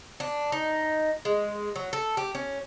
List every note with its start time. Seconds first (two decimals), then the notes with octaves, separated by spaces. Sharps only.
0.20 D4
0.52 D#4
1.25 G#3
1.76 F#3
1.93 A4
2.17 G4
2.35 C#4